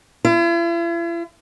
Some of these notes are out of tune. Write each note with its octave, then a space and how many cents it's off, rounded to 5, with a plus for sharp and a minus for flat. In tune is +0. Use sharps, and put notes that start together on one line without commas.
E4 +45